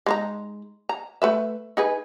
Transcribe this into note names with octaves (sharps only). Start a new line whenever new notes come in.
G#3 D#4 A#5
A#5
A3 B4 E5
D#4 G#4 B4